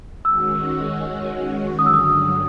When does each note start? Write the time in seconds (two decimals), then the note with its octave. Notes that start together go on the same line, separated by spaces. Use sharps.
0.25 D#3 G#3 C#4 F#4 E6
1.79 G2 D3 F#3 D#6
1.86 E6
1.94 D#6